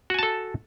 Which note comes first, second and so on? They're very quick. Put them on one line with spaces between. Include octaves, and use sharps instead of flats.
F#4 G#5 A5 A4